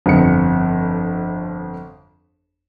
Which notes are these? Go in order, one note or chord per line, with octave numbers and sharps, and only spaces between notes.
G1 F2 C#7